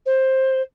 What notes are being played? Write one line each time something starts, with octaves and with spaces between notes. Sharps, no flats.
C5